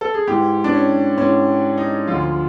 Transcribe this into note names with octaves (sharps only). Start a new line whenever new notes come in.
A4
G#4
G#2 E3 G4
D4
C#4
G#2 E3 C#4
D#4
D2 D3 F3 F4